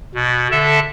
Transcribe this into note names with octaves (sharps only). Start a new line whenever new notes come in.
B2
D3 A4 E5 A5